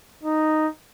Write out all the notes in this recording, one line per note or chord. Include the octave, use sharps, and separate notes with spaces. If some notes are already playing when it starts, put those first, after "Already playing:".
D#4